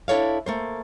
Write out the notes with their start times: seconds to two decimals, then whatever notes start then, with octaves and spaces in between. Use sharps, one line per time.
0.08 D4 E4 A4 C#5 F5
0.46 A3 A#3 C5